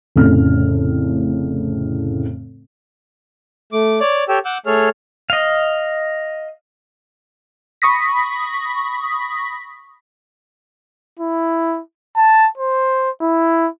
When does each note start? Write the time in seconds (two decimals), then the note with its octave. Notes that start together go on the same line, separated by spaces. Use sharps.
0.16 F1 A2 C#3 F6
3.72 A3 D6
4.00 C#5 D5 D6
4.29 G4 A4 C#5 G5 E6
4.45 F#5 D6 E6 F#6 G6
4.66 A3 G#4 A4 C#5 F6
5.30 D#5 F5
7.82 B5 C#6 D#6 A#6 B6
11.19 E4
12.16 A5
12.57 C5
13.21 E4